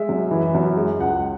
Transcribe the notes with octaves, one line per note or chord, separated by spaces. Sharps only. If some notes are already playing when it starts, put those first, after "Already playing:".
Already playing: G#3 E5
F#2
E3
F#2
G#3
C#2 F#5